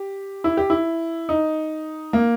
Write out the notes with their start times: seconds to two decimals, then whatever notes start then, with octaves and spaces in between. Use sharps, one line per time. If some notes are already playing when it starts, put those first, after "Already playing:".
Already playing: G4
0.44 E4
0.57 G4
0.70 E4
1.29 D#4
2.13 A#3